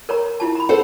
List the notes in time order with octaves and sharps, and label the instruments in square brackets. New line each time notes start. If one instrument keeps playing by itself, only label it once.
[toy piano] A#4 C#5 A#5
E4 F4 A5
A#5 B5
[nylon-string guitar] A4 C5 F#5